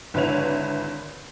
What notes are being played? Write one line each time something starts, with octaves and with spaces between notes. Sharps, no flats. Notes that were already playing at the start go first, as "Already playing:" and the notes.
G#1 D3 E4 B4 C#5 F7